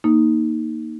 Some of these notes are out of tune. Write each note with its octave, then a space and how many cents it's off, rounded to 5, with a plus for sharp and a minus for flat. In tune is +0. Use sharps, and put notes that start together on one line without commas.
A#3 +0 D#4 +0